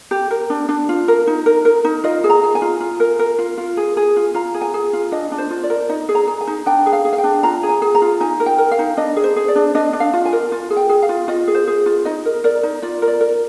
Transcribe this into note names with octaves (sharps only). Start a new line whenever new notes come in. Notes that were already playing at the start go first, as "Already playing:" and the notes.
G4
A#4
D4
D4
F4
A#4
D#4
A#4
A#4
D#4
F4 D#5
G#4
A#5
G#4
G#5
F4
F4
A#4
A#4
F4
F4
G#4
G#4
F4
F4 A#5
G#4
G#5
G#4
F4
D4 D#5
D4
C5
F4
D5
A#4
D#4 D#5
G#4
A#5
G#4
G#5
D#4
D4 G5
G#4
F5
G#4
F5
G5
D4
F4 A#5
G#4
G#5
G#4
A#5
F4
D#4 G#5
A#4
G5
A#4
F5
D#4
D4 D#5
G#4
C5
G#4
D5
D4
D4 D#5
D4
F5
F4
G#5
A#4
F4
G#4
G5
G#4
F5
F4
F4 D#5
G#4
C5
G#4
F4
D#4 D#5
A#4
A#4 D5
D#4
F4 D5
A#4
D5
A#4